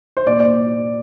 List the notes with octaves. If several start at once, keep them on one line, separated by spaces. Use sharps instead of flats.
C5
A#2 D5
D5